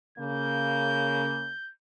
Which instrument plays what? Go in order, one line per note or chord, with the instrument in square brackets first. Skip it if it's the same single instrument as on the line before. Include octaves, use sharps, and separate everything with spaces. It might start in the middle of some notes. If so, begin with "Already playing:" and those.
[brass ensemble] C#3 A#3 [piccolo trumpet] G6